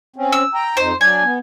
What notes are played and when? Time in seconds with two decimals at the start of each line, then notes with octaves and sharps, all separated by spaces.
0.16 C4 C#4
0.32 E6
0.54 G5 A#5
0.77 F2 D#4 C5
1.01 F#3 D4 D5 G#5
1.24 B3